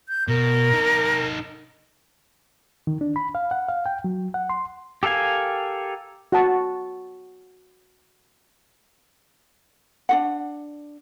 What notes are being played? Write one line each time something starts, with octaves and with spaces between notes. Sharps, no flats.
G6
B2 A#4
D#4 A4
D#3
D4
B5
F5
F#5
F5
G5
F#3
F#5
C6
G4 A4 A#4 F5 G#5
F#4 F#5 A5
D4 F#4 F#5